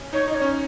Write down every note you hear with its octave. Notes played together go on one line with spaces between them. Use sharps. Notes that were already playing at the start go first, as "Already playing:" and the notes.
Already playing: C#4
D#4 C#5
D#4 D#5
C#5
C#4